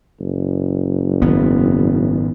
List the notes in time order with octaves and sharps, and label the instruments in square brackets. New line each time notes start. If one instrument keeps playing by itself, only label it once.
[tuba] F#1
[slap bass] G#1 B3